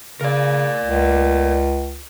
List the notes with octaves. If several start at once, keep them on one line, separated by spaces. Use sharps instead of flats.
C#3 A#4 D5
C#2